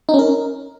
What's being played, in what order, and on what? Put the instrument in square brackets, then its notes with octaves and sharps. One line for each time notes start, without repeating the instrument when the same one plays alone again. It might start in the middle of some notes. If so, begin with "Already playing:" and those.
[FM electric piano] D#4
C#4
A#4